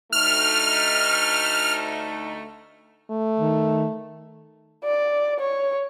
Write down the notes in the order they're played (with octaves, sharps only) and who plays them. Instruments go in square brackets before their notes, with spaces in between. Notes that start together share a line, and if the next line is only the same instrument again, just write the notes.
[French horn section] D2 A3 D#4 [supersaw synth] F6
[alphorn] A3
[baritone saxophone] D#3
[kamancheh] D5
C#5